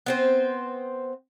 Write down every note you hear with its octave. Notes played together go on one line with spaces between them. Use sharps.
B3 C4 C5